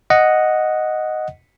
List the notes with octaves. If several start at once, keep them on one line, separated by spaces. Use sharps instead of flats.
D#5 F#5